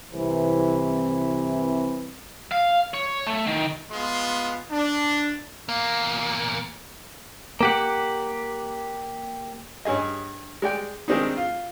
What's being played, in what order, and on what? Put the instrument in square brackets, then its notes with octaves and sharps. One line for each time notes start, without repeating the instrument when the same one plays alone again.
[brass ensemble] C2 C3 E3
[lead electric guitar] F5
C#5
A3
D#3
[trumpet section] G#3 B3 F4 C6
D4
[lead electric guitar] E2 A#3
[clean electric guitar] A#3 G4 F#5
[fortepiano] G2 C#4 G#4 D#5
G#3 D5 G5
D#3 G#3 C4 D4 D#4
F4